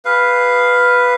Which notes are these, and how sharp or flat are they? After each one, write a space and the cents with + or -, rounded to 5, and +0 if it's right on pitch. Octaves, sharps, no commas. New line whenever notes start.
G#4 -45 B4 +0 F5 +0